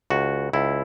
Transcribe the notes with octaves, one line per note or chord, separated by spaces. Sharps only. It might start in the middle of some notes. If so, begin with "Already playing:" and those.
C#2 F#4
C#2 E4